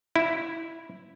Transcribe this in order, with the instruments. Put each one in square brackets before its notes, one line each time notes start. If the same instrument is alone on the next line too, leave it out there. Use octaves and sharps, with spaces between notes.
[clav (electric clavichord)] E4